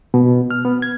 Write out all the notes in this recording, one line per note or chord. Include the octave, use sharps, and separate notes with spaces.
B2
F6
B3
G#6